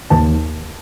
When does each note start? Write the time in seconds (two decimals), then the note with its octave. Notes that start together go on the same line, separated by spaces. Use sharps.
0.10 D#2 A5